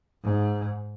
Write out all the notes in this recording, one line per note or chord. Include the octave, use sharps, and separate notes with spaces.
G#2